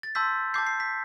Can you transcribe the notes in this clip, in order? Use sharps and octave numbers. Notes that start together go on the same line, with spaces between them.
A6
A5 C6 E6 G6 B6
A5 D6 G6 C7
C7
B6